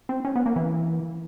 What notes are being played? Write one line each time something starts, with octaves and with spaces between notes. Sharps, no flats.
C4
C#4
B3
A#3
E3